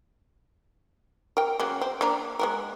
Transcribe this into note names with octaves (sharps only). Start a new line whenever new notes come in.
A#4 G5
C#3 F#3 A#3
C4
A#3 D4 A#5
G#3 B3 A#4